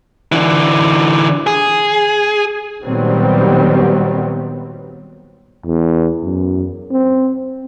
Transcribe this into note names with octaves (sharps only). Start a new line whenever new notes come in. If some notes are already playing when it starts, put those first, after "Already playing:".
D3 E3
G#4
A#2 D#3 F#3 G3 B3 C4
E2
F#2
C4